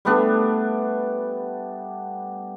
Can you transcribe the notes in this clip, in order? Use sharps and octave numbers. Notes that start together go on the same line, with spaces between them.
G3 A3 B3 D4